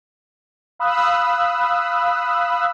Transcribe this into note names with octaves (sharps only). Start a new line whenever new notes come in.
F5 B5 D#6 E6 F#6